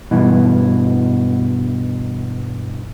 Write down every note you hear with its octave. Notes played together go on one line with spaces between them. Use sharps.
G2 B2 E3